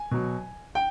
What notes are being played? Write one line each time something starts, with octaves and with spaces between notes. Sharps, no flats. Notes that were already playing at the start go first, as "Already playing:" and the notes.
Already playing: G#5
B2 F#3
G5